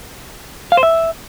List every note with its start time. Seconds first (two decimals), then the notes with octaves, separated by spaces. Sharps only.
0.72 F5
0.77 C5
0.83 E5